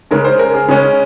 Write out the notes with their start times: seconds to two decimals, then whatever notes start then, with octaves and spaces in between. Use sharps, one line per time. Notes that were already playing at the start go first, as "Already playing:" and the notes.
0.11 C#3 G#3 C#4 A#4
0.24 C5
0.39 A#4
0.54 G#4
0.68 C#3 G#3 C#4